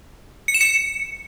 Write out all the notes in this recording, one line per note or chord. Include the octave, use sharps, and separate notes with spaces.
C#7
E7
C#7